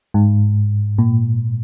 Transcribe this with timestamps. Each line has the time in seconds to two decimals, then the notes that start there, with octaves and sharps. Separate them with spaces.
0.14 G#2
0.98 A#2